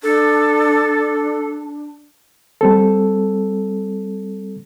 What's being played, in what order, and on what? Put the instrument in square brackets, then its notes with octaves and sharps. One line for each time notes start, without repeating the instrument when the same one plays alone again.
[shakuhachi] D4 [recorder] A4
[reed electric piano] G3 C4 A4